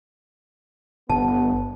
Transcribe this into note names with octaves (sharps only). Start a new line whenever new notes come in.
G1 B3 A5